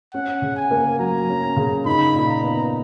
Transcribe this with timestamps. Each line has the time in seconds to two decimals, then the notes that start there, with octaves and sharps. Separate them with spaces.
0.14 C#4 F#5
0.42 C#3
0.56 G#5
0.71 A#3
0.99 F#3 A#5
1.29 C#4
1.57 C#3
1.86 D#4 B5
2.15 A#2
2.29 A#5
2.44 B3